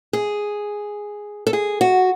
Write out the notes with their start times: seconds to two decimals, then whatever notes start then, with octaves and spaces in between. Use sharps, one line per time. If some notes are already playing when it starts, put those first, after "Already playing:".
0.13 G#4
1.47 A4
1.53 G#4
1.81 F#4